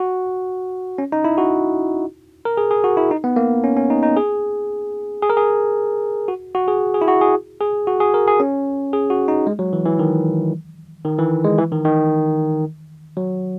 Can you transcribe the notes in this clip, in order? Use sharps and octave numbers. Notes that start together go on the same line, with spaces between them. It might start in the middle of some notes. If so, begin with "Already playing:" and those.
Already playing: F#4
C#4
D#4
E4
F#4
A#4
G#4
G#4
F#4
E4
D#4
B3
A#3
C#4
C#4
D#4
D#4
G#4
G#4
A#4
G#4
F#4
F#4
G#4
G#4
E4
F#4
G#4
G#4
F#4
G#4
A#4
G#4
C#4
G#4
F#4
D#4
G#3
F#3
E3
E3
D#3
D#3
E3
G#3
E3
D#3
D#3
F#3